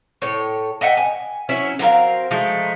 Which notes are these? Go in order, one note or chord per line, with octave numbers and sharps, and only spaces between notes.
A2 C#5
D#5 E5 F#5 G5
G#5
F#3 C#4 E4 E5
F#3 C4 A#4 F5
F3 G#3 A3 D#4